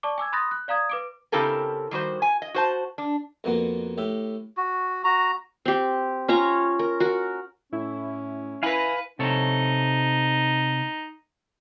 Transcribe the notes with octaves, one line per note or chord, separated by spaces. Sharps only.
D5 A5 C#6 D6
G#5 D6 E6 G#6
B5 C6 D#6 F#6 A6 A#6
F#6
D5 F5 A#5 D#6 G#6
B4 D6 D7
C#3 C4 E4 G4 A4 A#4
D#3 G3 F#4 C5
G#5
D#5
F#4 C5 A5
D4
F2 B2 A#3 B3
A2 G4 E5
F#4
F#4 A#5
C4 G4
C#4 F4 C#5 A#5
A#4
F#4 A#4
A2 C#4 E4
E4 B4 F5 G#5 B5 A#6
C3 D#4 A4 C#5